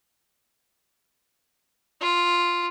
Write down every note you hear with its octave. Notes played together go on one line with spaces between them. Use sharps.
F4